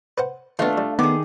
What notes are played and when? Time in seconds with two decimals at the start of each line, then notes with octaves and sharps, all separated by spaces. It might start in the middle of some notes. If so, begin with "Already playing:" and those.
0.18 B4 C5 F#5
0.59 D#3 A3 B3 D4 F4
0.78 G3
0.99 D#3 B3 G#4 D6